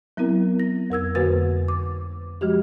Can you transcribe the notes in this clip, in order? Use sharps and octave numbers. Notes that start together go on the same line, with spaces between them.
F#3 B3 C4 E4 A#4
A#6
F2 A#4 E6 G#6
F2 D3 A#3 F#4 B4 A6
D6
F3 G#3 F#4 G4